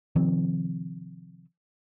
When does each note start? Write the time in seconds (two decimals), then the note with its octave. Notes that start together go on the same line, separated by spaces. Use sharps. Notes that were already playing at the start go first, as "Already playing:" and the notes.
0.15 C3 D#3 F3 C4